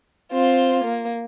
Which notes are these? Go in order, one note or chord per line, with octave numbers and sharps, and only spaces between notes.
C4 F4
A#3